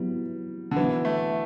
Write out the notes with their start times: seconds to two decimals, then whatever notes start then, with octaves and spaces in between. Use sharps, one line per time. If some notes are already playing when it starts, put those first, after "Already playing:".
Already playing: F#3 G3 B3 E4
0.71 D3
0.76 E3 F#3 B3 E4
1.05 A3